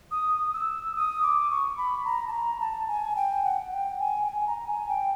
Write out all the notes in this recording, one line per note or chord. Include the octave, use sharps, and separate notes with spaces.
D#6
E6
D#6
D6
C#6
B5
A#5
A5
A#5
A5
G#5
G5
F#5
G5
G#5
G5
G#5
A#5
G#5
G5